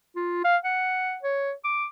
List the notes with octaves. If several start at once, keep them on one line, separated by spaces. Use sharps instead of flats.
F4
F5
F#5
C#5
D6